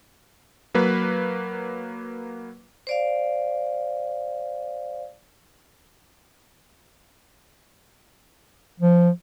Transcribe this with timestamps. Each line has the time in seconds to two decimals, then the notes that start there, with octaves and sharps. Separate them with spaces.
0.74 F#3 A#3 B4
2.87 C5 D5 F5
8.80 F3